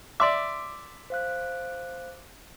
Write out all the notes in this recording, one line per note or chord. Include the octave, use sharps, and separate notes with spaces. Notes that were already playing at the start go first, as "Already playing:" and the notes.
D5 E5 C6 D6
C5 F5 F#6